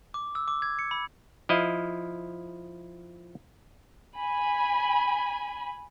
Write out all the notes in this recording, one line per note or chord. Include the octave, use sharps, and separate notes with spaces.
D6
E6
D6
G#6
C#7
B5
F3 E4 D#5 F5
G#5 B5